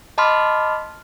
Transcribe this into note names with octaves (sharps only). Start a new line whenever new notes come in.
D#5 A5 B5 C6 D6 F6